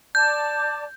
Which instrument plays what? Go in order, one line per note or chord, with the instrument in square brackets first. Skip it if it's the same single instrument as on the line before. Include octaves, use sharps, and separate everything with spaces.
[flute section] D5 A5 D6 [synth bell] G6